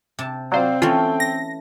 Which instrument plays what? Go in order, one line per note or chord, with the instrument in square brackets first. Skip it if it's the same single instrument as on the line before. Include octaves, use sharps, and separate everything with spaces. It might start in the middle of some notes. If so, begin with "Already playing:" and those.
[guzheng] C3 A5
[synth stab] F#3 C5 [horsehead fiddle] C4 [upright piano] D5 F5
[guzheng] E3 A3 C#4 [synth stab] F4 [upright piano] A4 G5
[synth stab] A#6